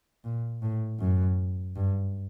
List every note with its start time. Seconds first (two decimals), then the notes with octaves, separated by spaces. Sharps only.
0.24 A#2
0.62 A2
0.99 F#2
1.76 G2